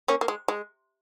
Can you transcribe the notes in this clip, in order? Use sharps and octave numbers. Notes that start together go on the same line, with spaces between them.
A#3 C#4
A#3
G#3
G#3